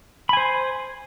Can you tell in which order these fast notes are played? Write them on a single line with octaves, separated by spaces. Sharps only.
B5 G#5 C5